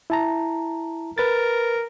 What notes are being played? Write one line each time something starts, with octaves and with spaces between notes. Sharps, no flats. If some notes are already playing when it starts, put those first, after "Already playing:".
E4 A5 A#5
A#4 B4 A6